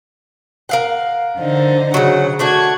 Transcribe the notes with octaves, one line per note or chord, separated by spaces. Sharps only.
A#4 F5 F#5
D3 D#4 C5
C#3 F#3 F#5
A3 D4 F#4 C#6 F#6 G#6